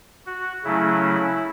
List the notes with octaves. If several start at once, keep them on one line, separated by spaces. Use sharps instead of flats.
F#4
C#3 F#3 A3 C#4 E4